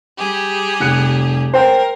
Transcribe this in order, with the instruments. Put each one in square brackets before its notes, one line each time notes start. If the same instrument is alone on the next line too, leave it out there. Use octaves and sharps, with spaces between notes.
[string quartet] G3 G4 G#4
[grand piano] F1 F#6 C#7
[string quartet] A#4 [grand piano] C5 G5